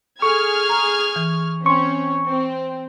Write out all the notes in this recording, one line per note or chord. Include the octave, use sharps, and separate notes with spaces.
G#4 A4 C#6 F6 G#6
A#5
E3
C4 C#4 C6 C#6
C4